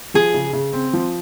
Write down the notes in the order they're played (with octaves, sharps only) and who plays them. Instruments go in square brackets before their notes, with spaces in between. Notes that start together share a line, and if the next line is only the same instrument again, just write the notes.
[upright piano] F3 [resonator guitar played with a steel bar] G#4
[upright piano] C#3
C#3
C4
F3